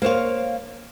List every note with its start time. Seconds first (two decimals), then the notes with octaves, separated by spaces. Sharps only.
0.02 A#3 C5 C#5 F5